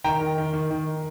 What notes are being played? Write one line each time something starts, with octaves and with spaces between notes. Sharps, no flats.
D#3 G5 A#5
D#3
D#3
D#3
D#3